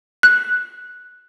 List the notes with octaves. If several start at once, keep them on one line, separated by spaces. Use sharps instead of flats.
F#6